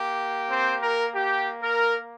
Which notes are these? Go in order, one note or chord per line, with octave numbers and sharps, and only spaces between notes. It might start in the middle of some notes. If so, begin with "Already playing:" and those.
Already playing: A#3 G4
C4 C5
A#4
G4
A#4